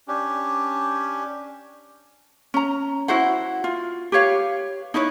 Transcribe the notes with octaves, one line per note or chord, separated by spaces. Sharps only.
C#4 D4 G4
C#4 A#5
E4 F#4 C5 F#5
F4
G4 B4 C#5 F5
D#4 E4 B4 C#5